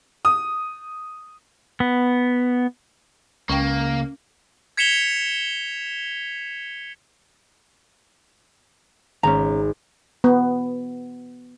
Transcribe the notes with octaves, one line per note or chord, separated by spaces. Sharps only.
D#6
B3
C#2 A#3 C#4 G5
G#6 B6 C#7 E7 F7 G7
G#1 C#4 A#5
B3